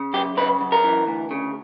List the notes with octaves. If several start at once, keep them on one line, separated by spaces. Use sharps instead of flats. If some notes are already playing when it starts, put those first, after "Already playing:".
Already playing: C#3
F#2 G4
C#3 B4
F#2
A#4
E3
D2
C#3